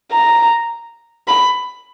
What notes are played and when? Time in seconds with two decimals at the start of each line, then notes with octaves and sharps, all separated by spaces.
0.12 A#5
1.28 B5